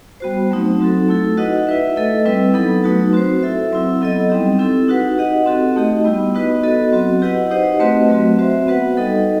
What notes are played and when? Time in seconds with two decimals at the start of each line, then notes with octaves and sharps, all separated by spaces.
0.20 G3 B3 F#4 C5
0.51 F#3 A3 C4 D#4
0.80 F#3 C4 D#4 F#4 A4
1.08 A3 E4 A4
1.37 D#4 F#4 B4 D#5 F#5
1.67 E4 B4 E5
1.96 A3 E4 A4 D#5
2.25 G3 C4 E4 B4
2.54 F#3 B3 D#4 A4
2.84 F#3 A3 D#4 F#4 B4
3.13 C4 F#4 C5
3.43 E4 A4 E5
3.72 F#3 C4 E4
4.01 F#3 B3 E4 A4 D#5
4.30 G3 C4 D#4 G4
4.59 C4 E4 A4
4.88 D#4 F#4 B4 F#5
5.18 D#4 G4 D#5 F#5
5.46 C4 F#4 A4
5.76 A3 D#4 G4 D#5
6.04 G3 B3 E4
6.34 B3 D#4 F#4 B4 D#5
6.63 B3 F#4 A4 D#5
6.92 F#3 C4 F#4
7.22 E4 G4 B4 D#5 F#5
7.51 D#4 G4 C5 D#5 F#5
7.80 A3 C4 F#4 B4 D#5
8.09 F#3 A3 C4 F#4
8.39 C4 F#4 C5 E5
8.67 B3 F#4 B4 F#5
8.97 G3 D#4 A4 D#5